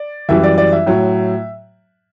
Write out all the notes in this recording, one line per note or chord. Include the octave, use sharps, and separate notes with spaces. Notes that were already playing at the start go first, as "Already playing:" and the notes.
Already playing: D5
F#2 E3 G3 E5
D5
D5
E5
A2 F#3